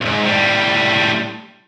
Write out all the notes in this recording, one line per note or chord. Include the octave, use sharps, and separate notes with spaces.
B1 G#2
A2 G3